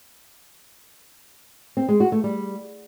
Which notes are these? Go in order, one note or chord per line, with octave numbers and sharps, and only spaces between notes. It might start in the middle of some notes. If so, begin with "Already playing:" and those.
C4
G#3
F#4
A3
G3